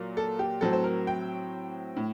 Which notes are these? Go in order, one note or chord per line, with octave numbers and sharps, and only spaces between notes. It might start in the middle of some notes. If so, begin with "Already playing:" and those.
Already playing: A#2 F#3
A4
G4
A2 F#3 C4 A4
C5
A#4
G5
A2